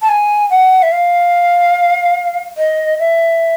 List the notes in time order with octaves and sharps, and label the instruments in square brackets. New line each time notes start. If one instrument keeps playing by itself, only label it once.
[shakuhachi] A5
G#5
F#5
E5
F5
D#5
E5